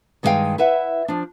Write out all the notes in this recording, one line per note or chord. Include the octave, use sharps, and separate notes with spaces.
G2 D#3 G#3 F#4 F5 G5
E4 B4 E5 F#5
F3 D4